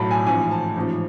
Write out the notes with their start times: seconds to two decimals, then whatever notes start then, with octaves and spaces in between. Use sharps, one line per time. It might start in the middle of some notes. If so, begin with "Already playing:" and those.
Already playing: B1 A2 F#3 A5 B5
0.11 G#5
0.26 A1 G#2 F3 G#5
0.51 A5
0.76 A1 G#2 F3